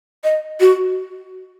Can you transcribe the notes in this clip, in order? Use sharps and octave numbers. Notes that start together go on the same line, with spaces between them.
D#5
F#4